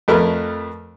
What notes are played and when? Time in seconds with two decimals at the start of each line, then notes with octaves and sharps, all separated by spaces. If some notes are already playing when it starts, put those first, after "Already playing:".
0.08 F2 A3 A#4 B4 F6